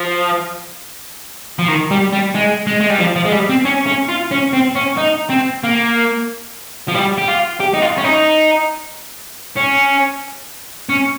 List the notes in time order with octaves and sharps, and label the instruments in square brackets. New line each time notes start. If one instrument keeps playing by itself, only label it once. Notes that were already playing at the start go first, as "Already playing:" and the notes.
Already playing: [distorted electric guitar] F3
F3
D#3
G3
G3
G#3
G#3
G#3
G3
F3
F3
G#3
G3
C4
C#4
C#4
F4
C#4
C4
C#4
D#4
C4
A#3
F3
G3
G4
F4
G4
D#4
F4
C#4
D#4
C#4
C#4